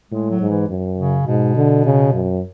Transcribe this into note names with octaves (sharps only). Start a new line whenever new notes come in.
A2 G#3
F#3
G#2
E3
F#2
C#3
G#2 B2
D3
C#3
F#2